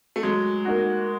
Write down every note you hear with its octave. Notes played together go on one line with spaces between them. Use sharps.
A3
F#3 G#3
A#3 D#4 F#4